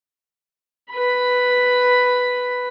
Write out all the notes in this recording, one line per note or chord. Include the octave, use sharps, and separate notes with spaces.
B4 B5